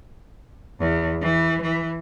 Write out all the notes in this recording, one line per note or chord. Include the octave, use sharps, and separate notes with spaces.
E2
E3
E3